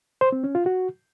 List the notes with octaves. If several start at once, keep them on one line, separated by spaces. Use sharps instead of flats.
C5
C4
C#4
F4
F#4